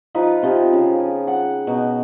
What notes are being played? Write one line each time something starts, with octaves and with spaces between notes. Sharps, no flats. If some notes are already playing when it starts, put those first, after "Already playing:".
F3 D#4 F4 B4
C3 F3
C#3
G#5
F#5
B2 D#4